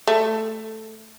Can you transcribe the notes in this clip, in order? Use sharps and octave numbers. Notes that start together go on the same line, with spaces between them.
A3